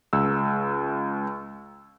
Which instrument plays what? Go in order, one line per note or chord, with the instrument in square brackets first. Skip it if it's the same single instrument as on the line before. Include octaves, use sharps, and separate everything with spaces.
[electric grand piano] C#2 E6